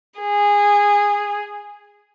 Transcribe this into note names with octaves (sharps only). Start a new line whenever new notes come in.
G#4